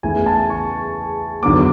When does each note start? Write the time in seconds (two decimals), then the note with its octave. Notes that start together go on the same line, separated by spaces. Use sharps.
0.03 E2 C#3 E3 A3 G#5
0.26 A5
0.50 C#6
1.43 E2 D3 F#3 B3 D6